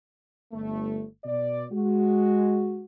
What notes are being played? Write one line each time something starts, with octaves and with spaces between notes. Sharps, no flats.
G1 A3
B2 D5
G#3 F#4